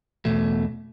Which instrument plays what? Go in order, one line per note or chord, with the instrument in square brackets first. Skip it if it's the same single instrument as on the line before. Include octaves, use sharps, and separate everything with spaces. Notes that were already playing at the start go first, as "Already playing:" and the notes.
[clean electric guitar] E2 B2 A3